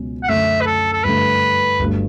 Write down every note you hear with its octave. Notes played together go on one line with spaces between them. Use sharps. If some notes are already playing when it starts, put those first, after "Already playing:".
Already playing: C#2 B2 F#3 C#4
F#5
F#2 D3 A3 C#4 E5
B4
A4
A4
G2 D3 A3 B4
G1 G2 F#3 A3